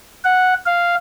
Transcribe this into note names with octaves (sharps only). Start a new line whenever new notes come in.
F#5
F5